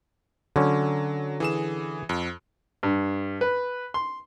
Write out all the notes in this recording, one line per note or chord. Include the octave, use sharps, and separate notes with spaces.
D3 F#3 C#4
E3 G#4 E7
F2
G2
B4
C6